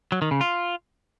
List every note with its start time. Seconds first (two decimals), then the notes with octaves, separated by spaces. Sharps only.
0.12 F#3
0.22 D#3
0.31 C#3
0.41 F4